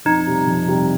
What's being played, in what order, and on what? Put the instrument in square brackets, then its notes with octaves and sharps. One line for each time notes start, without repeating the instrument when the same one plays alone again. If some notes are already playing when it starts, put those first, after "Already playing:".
[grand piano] F2 [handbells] D#4
[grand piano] C3 G3
F2
C3 G3